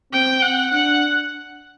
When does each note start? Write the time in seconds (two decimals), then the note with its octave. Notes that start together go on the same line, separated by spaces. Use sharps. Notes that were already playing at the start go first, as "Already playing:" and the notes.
0.13 C4 G5
0.42 F#5
0.71 D4 F#5